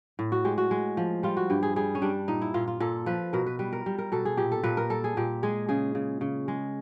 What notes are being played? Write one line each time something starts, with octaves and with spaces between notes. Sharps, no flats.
A2
F#4
G#3 G4
F#4
G#3
F3
G3 F4
F#4
G2 G4
G#4
G3 G#4
C#4
G3 D4
A#2 D#4
E4
A#2 F4
F4
A#2 A4
F3 B4
B2 A#4
B4
G3 B4
A#4
G3
A#4
B2 A4
G#4
A#2 G4
A4
A#2 B4
A#4
G3 A4
G#4
A#2 G4
G#3 G#4
C#3 G#4
C#3
C#3
G#3